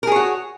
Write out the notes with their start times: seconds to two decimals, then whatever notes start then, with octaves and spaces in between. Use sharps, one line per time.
0.03 A#4
0.07 G#4
0.12 C#5
0.16 F#4